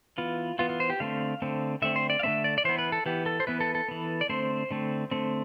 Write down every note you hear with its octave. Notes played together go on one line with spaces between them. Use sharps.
E3 B3 F4
E3 B3 F4
F4
C5
G4
D3 A3 C4 F5
D3 A3 C4
D3 A3 C4 E5
C5
D5
F5
D3 A3 C4 E5
D5
D5
E3 B3 C5
B4
A4
E3 B3 G4
A4
C5
E3 B3 B4
A4
A4
E3 B3
D5
D3 A3 C4 C5
D3 A3 C4
D3 A3 C4